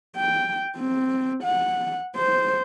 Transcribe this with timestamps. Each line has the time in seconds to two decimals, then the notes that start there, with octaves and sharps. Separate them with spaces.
0.16 G5
0.77 C4
1.43 F#5
2.16 C5